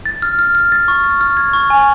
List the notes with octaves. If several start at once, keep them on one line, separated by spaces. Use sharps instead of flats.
A6
F6
F6
F6
A6
C#6
A6
F6
G#6
C#6
G#5